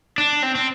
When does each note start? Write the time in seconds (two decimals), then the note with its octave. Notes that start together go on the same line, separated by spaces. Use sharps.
0.18 D4
0.43 C4
0.55 C4